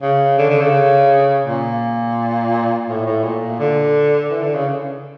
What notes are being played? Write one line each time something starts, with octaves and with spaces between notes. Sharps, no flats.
C#3
D3
D3
C#3
A#2
A2
A2
A#2
D3
E3
D3
C#3